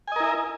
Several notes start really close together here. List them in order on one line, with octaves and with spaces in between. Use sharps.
G#5 D#5 A#4 E4